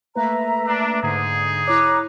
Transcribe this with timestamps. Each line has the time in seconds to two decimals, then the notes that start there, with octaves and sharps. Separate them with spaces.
0.15 A3 A#3 B4 E5 A#5
0.67 D4
1.03 G#2 D3 D#4 G#4
1.67 E4 C#5 A#5 D6 F#6